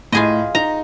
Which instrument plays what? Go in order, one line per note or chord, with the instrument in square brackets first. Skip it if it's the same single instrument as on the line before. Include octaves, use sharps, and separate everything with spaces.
[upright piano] A2 [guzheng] F4 G#4 D#5
[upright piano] D#4 [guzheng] A#5